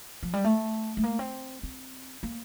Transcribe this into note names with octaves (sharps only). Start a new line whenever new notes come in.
F3
G3
A3
A3
A#3
C4
C4
A#3